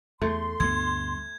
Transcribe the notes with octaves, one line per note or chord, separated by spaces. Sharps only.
E2 A3 C6
D2 G2 B3 G#6